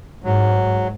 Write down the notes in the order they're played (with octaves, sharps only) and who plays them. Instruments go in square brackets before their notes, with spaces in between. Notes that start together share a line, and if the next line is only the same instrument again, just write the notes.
[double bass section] G#2 [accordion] F#3